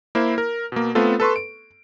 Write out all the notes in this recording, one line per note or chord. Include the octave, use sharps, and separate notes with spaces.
A#3 E4 C5
A#4
B2 A#3
A3 B3 C4 F4 A4
A4 B4 C6 C#6
D7